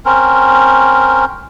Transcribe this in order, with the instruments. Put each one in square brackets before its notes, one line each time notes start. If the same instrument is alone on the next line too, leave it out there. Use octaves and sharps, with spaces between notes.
[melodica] C4 C#4 A#4